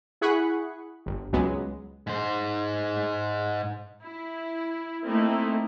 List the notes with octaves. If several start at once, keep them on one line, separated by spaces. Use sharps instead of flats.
E4 G#4 F#5 B5 C#6 F#6
G1
C#2 F#3 G#3 B3
G#2 C5
E4
A3 A#3 C4 D#4 E4